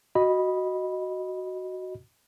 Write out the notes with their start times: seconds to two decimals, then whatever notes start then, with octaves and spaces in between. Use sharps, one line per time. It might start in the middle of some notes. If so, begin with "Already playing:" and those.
0.15 F#4 D#5 B5